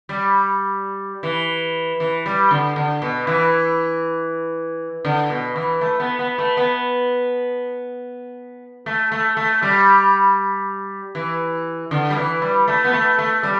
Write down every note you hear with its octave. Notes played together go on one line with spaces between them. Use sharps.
G3
E3
E3
G3
D3
D3
B2
E3
D3
B2
E3
A3
B3
B3
A3
B3
A3
A3
A3
G3
E3
D3
G3
E3
G3
A3
B3
A3
A3
G3